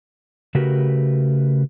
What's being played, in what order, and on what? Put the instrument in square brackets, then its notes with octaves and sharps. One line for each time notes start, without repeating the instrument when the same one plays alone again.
[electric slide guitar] C#3 A3 F#4 G4 A#4 B4